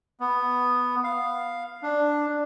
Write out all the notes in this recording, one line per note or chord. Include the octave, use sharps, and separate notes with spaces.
B3
F5
D4